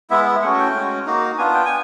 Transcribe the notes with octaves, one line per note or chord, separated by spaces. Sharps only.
G#3 B3 E4 E5
A3 C#4 F#4 F#5
G5
G#3 C#4 F#4
A#3 D#4 F#4
B3 D4 F4 G#5
G5
G#5